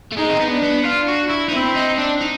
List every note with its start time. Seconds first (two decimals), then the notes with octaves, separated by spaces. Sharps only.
0.12 A3
0.17 G#3 D#4
0.29 C4
0.40 B3
0.51 D4
0.63 B3
0.85 D4 F4
1.08 F#4
1.30 E4
1.48 D#4
1.53 C4 E4
1.75 D#4
1.98 D4
2.21 D#4